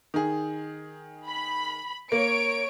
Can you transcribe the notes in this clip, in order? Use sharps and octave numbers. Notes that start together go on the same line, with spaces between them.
D#3 G#4
B5
A#3 C#5 D7